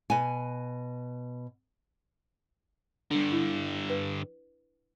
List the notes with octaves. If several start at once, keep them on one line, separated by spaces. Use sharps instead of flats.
B2 G#5
G2 D3 D4
E4
B4